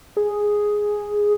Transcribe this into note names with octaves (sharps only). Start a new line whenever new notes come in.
G#4